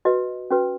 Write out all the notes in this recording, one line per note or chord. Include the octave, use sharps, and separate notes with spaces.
F#4 B4 D#5
C#4 F#4 B4